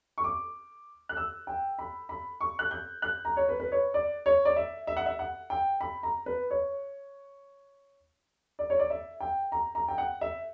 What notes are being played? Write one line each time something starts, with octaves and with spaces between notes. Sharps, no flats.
C#6
D6
F#6
E6
G5
B5
B5
C#6
F#6
G6
F#6
A#5
C#5
B4
B4
C#5
D5
C#5
D5
E5
E5
F#5
E5
F#5
G5
B5
A#5
B4
C#5
D5
C#5
D5
E5
G5
A#5
A#5
G5
F#5
E5